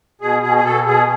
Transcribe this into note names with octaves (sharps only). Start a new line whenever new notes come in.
B2 G#4
B2 G#4
G#4
B2 A4
B2 G#4